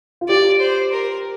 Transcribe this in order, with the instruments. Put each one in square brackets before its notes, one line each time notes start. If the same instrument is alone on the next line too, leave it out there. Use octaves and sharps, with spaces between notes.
[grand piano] F4
[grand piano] G4 [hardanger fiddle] D5
[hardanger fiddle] C5
A#4